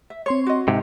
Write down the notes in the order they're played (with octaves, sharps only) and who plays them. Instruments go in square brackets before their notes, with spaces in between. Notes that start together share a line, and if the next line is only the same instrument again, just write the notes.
[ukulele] E5
[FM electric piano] C4 C6 C#6 [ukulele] C#5
[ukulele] F#4 D#5
[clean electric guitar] G#2 C3